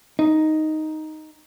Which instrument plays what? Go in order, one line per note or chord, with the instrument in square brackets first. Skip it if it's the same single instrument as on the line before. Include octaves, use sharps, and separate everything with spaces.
[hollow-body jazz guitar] D#4